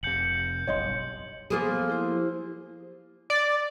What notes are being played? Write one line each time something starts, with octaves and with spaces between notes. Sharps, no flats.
F1 C3 G6 C#7 F#7
F#1 B1 G2 C#5 D#5 C6
F3 A#3 B3 G#4
E4 G4 C5
D5